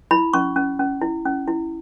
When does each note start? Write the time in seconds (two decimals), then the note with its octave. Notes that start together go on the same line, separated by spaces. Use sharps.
0.11 E4 B5
0.33 C#4 C#6
0.56 C#4
0.79 C#4
1.02 E4
1.26 C#4
1.48 E4